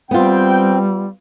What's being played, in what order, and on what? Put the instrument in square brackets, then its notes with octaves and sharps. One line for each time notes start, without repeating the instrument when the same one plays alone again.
[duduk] G3 [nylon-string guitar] B3 F4 [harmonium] C4 [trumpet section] G5